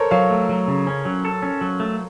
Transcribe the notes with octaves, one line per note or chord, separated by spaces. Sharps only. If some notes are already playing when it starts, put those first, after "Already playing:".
Already playing: A4 A#4 C5 C#5
F#3 C#5 F5
A3
F#3
C#3
C#4
F#3
A4
C#4
F#3
A3